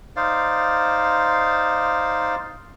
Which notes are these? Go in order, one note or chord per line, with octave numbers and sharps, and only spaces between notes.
D#4 C5 D5 F5